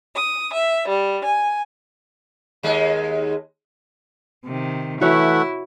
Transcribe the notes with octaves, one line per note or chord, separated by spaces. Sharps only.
D#6
E5
G3
G#5
D#2 G#3
C3 D#3
E3 A3 E4 F#4 C#5 E5 F#5